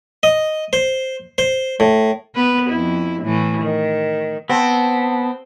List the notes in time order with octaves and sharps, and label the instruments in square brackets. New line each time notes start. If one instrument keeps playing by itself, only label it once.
[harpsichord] D#5
C5
C5
A2
[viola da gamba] B3 B4
F2 E4
A2 E3 A3
D#3
[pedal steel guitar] B3 [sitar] C4 [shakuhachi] A5